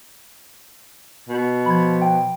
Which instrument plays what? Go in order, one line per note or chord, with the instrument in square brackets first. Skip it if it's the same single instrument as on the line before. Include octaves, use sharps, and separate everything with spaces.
[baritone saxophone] B2
[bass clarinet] F3 [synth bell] B5 G#6
[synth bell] G5